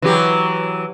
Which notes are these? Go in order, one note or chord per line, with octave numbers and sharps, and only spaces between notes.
E3 F#3 G4